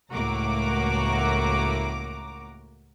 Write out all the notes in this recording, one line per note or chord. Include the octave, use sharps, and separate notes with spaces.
C#2 A2 A#3 F#4 A#5 D6